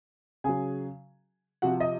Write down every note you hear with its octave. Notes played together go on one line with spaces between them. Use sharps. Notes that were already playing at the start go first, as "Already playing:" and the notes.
C#3 F#3 G#4 G#5
C3 F3 F#4 F#5
D#5